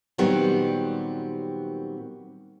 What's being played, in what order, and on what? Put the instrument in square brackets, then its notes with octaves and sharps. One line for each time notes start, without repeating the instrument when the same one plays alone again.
[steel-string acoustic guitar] A#2 D#3 F#3 G3 B3 C4